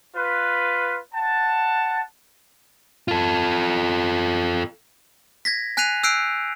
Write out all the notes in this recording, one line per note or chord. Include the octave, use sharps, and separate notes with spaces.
F4 B4
F#5 A5
F4 A4
G#6 A#6 B6
G#5 F#6 B6 C7 D#7 F7
E6 F#6 G6 C7 D7